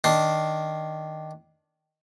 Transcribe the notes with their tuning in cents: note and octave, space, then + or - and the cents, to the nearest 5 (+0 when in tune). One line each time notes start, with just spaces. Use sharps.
D#3 +0 D4 +0 C6 +0